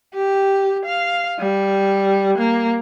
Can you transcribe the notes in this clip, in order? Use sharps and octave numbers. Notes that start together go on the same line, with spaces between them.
G4
F5
G3
A#3